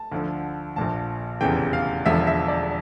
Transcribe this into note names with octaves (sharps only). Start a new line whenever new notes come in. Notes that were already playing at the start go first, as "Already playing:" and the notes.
Already playing: A5
D2 D3 F3
A#1 A#2 F3 A5
F1 E2 C#3 E3 G5
F5
E1 E2 D3 F3 E5
E5
D5